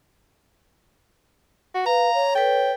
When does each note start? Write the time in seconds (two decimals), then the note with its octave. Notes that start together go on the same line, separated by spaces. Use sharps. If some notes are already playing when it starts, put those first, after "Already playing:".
1.74 F#4
1.86 B4 F5 A#5
2.14 C#5
2.35 A4 B4 G5